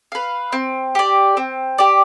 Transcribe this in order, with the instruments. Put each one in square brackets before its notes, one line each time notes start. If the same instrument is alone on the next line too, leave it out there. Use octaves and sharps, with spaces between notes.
[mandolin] B4 F5
C4
G4 D5
C4
G4 D5